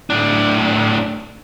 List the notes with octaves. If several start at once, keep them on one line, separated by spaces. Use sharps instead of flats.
A2 D4